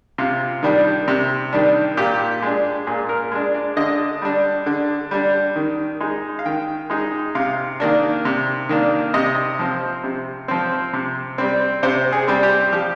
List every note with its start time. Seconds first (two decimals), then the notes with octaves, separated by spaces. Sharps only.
0.18 C3 F4
0.63 D#3 G3 D4
1.08 C3
1.53 D#3 G3 D4
1.97 A#2 G4
2.42 G#3 D4
2.87 A#2 G#4
3.09 A#4
3.32 G#3 D4
3.54 D5
3.77 D3 D#5
4.22 G3 D4
4.66 D3
5.11 G3 D4
5.56 D#3
6.00 G#3 D#4
6.39 F5
6.46 D#3 G5
6.90 G#3 D#4
7.35 C3 F5
7.80 D#3 A#3 D4
8.25 C3
8.69 D#3 A#3 D4
9.14 C3 D#5
9.59 F3 C4
10.04 C3
10.48 F3 C4
10.93 C3
11.38 G3 C4
11.83 C3 C5
12.12 G#4
12.28 G3 C4
12.43 G4
12.72 F3 G4